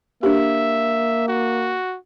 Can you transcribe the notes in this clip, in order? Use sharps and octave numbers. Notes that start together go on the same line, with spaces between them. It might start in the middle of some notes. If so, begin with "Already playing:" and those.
A#3 D4 G4 E5
F#4